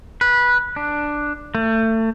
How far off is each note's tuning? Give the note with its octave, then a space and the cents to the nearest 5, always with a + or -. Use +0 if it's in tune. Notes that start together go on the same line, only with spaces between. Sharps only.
B4 -15
D4 +5
A3 +30